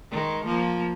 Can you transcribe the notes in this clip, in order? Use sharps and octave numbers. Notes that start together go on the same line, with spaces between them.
D#3 G#3
F3 A#3